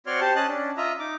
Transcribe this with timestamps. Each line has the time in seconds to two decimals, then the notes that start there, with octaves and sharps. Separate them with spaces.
0.06 C4 F#4 C#5 D5 C6 F6
0.21 G4 C5 A5
0.36 C#4 D#5 A5 F#6
0.48 C#4 D4
0.77 F4 D#5 E5 A#5
1.00 D#4 D6